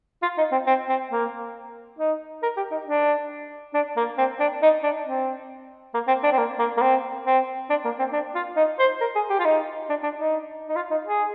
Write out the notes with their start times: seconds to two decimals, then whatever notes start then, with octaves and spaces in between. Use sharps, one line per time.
0.22 F4
0.38 D#4
0.52 C4
0.67 C4
0.89 C4
1.11 A#3
1.99 D#4
2.43 A#4
2.57 G4
2.71 D#4
2.86 D4
3.74 D4
3.97 A#3
4.18 C4
4.40 D4
4.62 D#4
4.83 D4
5.06 C4
5.94 A#3
6.08 C4
6.23 D4
6.32 C4
6.38 A#3
6.59 A#3
6.77 A#3
6.82 C4
7.25 C4
7.70 D4
7.84 A#3
7.99 C4
8.12 D4
8.35 F4
8.56 D#4
8.79 C5
9.01 A#4
9.15 G#4
9.30 G4
9.39 F4
9.45 D#4
9.89 D4
10.03 D4
10.18 D#4
10.69 D#4
10.76 F4
10.91 D#4
11.06 G#4